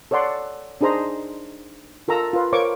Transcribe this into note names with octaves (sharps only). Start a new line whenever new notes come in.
A4 C#5 D5 F#5 C6
D4 D#4 G#4 C5 A#5 C6
F4 A4 A#4 A#5 E6
F4 B4
A#4 C5 C#5 F5 C#6 D6